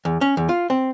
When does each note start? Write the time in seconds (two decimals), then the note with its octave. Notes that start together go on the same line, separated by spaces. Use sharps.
0.05 E2
0.21 C#4
0.37 E2
0.49 F4
0.70 C4